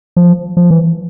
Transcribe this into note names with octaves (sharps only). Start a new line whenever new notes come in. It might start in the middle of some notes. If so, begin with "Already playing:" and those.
F3
F3
E3